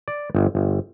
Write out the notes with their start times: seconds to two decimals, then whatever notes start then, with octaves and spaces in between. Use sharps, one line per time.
0.08 D5
0.35 G1
0.55 G1